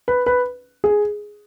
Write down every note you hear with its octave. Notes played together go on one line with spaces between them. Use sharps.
B4
B4
G#4